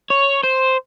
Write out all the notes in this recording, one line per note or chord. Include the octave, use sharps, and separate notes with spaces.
C#5
C5